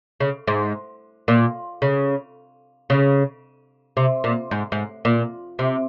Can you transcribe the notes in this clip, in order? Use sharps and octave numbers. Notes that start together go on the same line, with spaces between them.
C#3
G#2
A#2
C#3
C#3
C3
A#2
G#2
G#2
A#2
C3